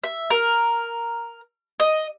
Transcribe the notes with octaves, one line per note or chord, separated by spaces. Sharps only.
E5
A#4
D#5